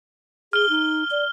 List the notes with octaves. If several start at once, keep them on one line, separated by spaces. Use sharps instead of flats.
G#4 F6 G7
D#4
D5